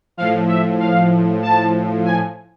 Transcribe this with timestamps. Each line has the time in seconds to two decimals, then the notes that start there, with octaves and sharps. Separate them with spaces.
0.17 A2 F3 F5
0.48 E5
0.80 F5
1.43 A5
2.05 G#5